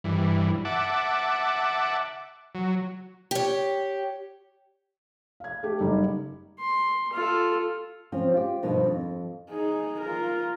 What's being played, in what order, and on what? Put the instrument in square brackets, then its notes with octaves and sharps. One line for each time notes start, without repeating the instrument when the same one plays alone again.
[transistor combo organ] G2 E3
E5 F#5 A5 D6
F#3
[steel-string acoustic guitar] G4 C#5
[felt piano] F5 G#6
A3 G4
F#1 G3 D#4 G4
[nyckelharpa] C6
F4 A4
[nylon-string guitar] F3 C4 C#4
F4 G4
G2 B2 D#3 F3
F2
[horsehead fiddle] D#4 G#4
F4 A#4